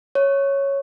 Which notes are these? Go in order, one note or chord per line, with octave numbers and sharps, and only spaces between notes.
C#5